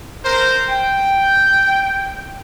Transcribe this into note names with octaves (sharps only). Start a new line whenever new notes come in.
A#4 C5
G5